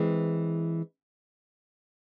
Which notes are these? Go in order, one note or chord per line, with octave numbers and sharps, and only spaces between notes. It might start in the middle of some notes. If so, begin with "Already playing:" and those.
Already playing: E3 G#3 C4